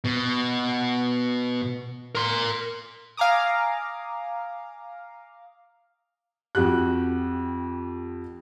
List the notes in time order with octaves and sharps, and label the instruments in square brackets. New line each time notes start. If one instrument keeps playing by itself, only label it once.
[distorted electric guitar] B2
A#4 C6
[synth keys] F5 G#5 A#5 D6 D#6
[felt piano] F2 F#4 G4 F#6